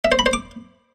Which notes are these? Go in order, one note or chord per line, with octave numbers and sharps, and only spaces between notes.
E5
C5
B5
C5
D6